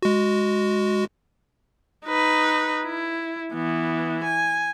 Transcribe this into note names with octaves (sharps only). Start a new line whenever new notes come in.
G#3 F#4
D#4 B4
E4
E3 B3
G#5